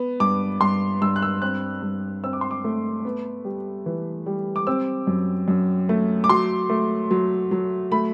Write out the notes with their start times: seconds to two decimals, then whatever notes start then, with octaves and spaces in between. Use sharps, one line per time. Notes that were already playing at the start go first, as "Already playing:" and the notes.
Already playing: B3
0.20 G2 D6
0.61 G2 C6
1.02 G2 E6
1.16 F#6
1.22 E6
1.42 C4 F#6
1.82 G2
2.24 C4 E6
2.33 D6
2.41 C6
2.51 D6
2.64 A3
3.05 B3
3.45 G3
3.86 E3
4.26 G3
4.56 D6
4.67 C4 E6
5.07 F#2
5.48 F#2
5.89 A3
6.24 D6
6.29 F#3 C6
6.70 A3
7.11 F#3
7.51 F#3
7.91 A3 B5